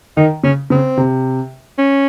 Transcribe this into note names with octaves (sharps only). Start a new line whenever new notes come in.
D#3 D#4
C#3 C#4
C#3 C4
C3
C#4